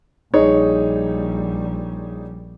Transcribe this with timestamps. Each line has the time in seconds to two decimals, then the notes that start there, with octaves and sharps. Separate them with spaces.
0.34 A#1 G3 D#4 G#4 C#5